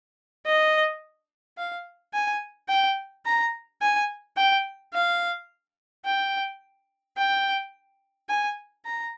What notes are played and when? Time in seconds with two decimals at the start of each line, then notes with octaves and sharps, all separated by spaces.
0.46 D#5
1.57 F5
2.14 G#5
2.69 G5
3.25 A#5
3.82 G#5
4.37 G5
4.94 F5
6.05 G5
7.18 G5
8.29 G#5
8.85 A#5